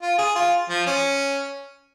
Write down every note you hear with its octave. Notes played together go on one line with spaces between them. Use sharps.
F4
G#4
F4
F3
C#4